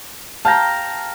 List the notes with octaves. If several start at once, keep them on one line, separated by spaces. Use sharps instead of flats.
F5 G5 A5 A#5